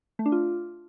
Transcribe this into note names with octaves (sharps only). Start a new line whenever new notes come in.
A3
D4
F4